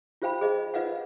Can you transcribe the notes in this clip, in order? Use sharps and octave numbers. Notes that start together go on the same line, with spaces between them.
F4 G4 C5 F5 G5 B5
G#4 C5 D#5
F4 B4 D#5 F5 F#5